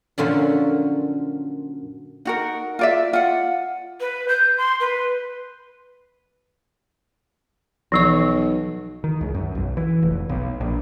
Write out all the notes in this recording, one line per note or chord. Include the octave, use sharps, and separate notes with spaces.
F#2 A#2 D3 F3 C#4 F4
D#4 F#4 A#4
F4 D5 E5
F4 F#5
B4
G6
C6
B4
B1 E3 F3 C#6
D#3
C#2
F#2
B1
E3
F1
B1
A#1